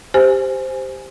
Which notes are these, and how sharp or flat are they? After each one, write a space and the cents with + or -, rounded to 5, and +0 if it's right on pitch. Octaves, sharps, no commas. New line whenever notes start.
G4 +0 C5 -5 G#5 +0